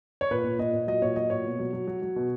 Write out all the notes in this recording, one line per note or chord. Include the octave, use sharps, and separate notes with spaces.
C#5
A#2 B4
A#2
A#2 D#5
A#2
F#3 D#5
A#2 C#5
F#3 D#5
A#2 C#5
B2
F#3
F#3
F#3
F#3
B2